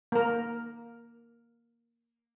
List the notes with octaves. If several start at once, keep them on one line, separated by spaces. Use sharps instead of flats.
A#3 A#4